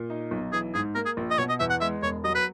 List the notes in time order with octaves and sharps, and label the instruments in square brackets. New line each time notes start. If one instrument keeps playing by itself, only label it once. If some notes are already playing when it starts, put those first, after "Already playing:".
Already playing: [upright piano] A#2
D#4
B1
[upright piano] E3 [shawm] G#4
[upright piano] G#2 [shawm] G#4
[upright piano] A#3 [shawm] A#4
[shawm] G#4
[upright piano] A#1
[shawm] D#5
[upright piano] B2 [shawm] C#5
[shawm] D#5
[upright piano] E2 [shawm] E5
[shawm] F#5
[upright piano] G#3 [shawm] E5
[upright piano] E1 [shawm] C#5
[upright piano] F#3 [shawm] D#5
[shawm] B4